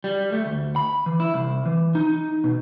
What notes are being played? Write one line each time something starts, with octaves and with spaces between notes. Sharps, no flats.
G3
A3
D2
B5
E3
E4
C2
E3
D#4
B2